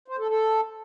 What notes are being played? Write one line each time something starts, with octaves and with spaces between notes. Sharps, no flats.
C5
A4
A4